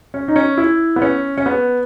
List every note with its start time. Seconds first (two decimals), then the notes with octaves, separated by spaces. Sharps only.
0.14 C#4
0.28 D#4
0.36 C#4
0.57 E4
0.96 B3
1.02 C#4
1.37 C#4
1.46 B3